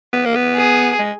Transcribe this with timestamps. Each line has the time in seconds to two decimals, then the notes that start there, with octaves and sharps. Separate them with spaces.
0.13 B3
0.25 A#3
0.36 B3
0.56 G#4
0.99 G#3